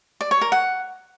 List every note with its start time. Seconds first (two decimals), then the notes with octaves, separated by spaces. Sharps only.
0.21 D5
0.31 C#5
0.41 A#4
0.52 F#5